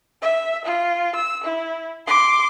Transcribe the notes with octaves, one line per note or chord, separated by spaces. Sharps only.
E5
F4
E6
E4
C6 D6